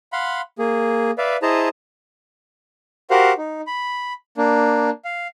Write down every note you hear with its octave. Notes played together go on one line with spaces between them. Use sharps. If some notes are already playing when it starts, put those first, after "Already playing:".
F5 F#5 B5 C6
A#3 G#4
B4 D5 E5 F5
E4 G#4 C5 D#5 A5 A#5
F#4 G4 A#4 C5 F5 F#5
D#4
B5
A#3 D4
F5